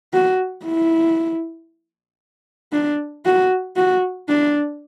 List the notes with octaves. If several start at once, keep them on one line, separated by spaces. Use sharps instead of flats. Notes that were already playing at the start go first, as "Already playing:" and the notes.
F#4
E4
D4
F#4
F#4
D4